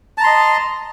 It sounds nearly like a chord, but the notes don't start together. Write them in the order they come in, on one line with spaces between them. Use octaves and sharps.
A5 A#5 C6 D#5